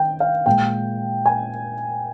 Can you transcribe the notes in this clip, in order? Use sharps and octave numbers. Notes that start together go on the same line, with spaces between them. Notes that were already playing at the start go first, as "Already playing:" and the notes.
Already playing: D#3 G5
F5
A#2 G#3 G5
G#5